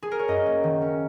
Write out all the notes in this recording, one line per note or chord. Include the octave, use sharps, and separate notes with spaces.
G#4
A#4
C#5
F#2 D#5
A#3
D#3
C#4